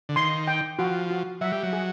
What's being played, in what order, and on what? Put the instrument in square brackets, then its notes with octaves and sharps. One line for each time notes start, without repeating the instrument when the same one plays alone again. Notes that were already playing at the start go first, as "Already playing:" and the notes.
[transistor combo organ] D3
[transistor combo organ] D#3 [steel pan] C6
[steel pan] G5
[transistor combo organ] F3 [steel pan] F#4
[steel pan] F#4
[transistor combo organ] F#3 [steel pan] E5
[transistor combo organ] G3
F#3
[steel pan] G#4